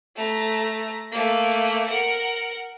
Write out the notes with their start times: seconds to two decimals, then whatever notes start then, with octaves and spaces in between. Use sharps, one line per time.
0.16 A3 A#5
1.11 A3 A#3
1.89 A#4 F#5